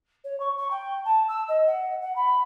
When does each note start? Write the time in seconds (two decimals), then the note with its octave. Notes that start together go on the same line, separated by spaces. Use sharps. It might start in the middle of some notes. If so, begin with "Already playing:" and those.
0.24 C#5
0.40 C#6
0.57 C#6
0.70 G5
1.05 A5
1.28 E6
1.48 D#5
1.67 F#5
2.01 F#5
2.15 B5